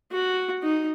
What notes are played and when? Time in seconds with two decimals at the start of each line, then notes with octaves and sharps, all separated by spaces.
0.12 F#4
0.63 D#4